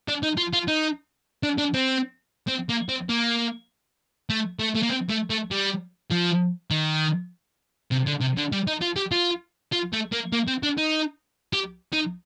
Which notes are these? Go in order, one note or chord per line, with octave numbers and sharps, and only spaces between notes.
D4
D#4
F4
F4
D#4
D4
D4
C4
C4
A#3
C4
A#3
A3
A3
A3
A#3
C4
A3
A3
G3
F3
D#3
C3
D3
C3
D3
G3
D#4
F4
G4
F4
F4
A3
A#3
A#3
C4
D4
D#4
G4
D#4